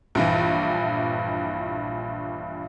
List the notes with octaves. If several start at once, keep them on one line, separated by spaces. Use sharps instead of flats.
A#1 G2 E3